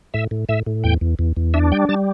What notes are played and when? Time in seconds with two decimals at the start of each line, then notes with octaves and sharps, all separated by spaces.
0.14 A2 E5
0.31 A2
0.49 A2 E5
0.66 A2
0.84 E2 G5
1.01 E2
1.19 E2
1.37 E2
1.54 D4 E5
1.72 G3 G5
1.89 G3 A5